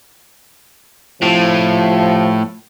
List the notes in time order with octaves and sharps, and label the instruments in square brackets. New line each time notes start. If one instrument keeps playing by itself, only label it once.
[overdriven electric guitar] A2 [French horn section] C3 F3